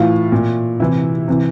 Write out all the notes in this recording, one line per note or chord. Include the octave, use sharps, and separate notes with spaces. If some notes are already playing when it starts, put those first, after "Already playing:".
Already playing: A2 E3 F4
A#2
C3 E3 E4
C3 E3